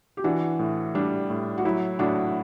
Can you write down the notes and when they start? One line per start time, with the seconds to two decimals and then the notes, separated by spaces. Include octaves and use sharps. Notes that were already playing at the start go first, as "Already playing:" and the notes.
0.17 G4
0.24 E3 D4 F#4
0.59 A2
0.95 G3 D4
1.30 A2
1.58 F#4
1.65 F#3 E4
1.99 A2 D4 F#4